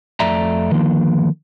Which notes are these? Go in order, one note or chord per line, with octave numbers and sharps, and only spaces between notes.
F2 A3 D5 E5 A#5
D3 D#3 F3 A#3